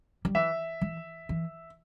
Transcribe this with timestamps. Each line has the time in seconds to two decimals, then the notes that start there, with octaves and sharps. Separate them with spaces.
0.25 G3
0.35 E3 E5
0.81 E3
1.29 E3